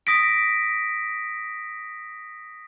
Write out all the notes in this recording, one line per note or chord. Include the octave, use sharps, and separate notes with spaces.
D#6 A#6 B6 D7